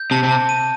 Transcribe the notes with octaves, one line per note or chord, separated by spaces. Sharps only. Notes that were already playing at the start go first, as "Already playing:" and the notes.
Already playing: G6
C3 A5
C3
A5
D#7